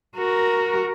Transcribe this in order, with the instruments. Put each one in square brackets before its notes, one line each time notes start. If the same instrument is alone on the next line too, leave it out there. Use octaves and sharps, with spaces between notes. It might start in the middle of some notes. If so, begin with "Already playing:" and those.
[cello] F#4 A#4